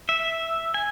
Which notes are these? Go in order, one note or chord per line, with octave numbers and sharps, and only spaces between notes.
E5
G#5